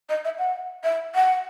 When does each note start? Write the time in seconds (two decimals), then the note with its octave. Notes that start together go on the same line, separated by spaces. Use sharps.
0.09 D#5
0.25 E5
0.39 F#5
0.84 E5
1.15 F#5